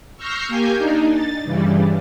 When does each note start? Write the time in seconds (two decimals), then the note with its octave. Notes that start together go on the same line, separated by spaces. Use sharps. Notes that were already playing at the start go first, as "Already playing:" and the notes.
0.17 C#6 E6 F6 G6 A#6 C7
0.48 A#3 G4 G#5 G6
0.78 D4 D#4
1.11 A6
1.44 G2 C#3 E3 G3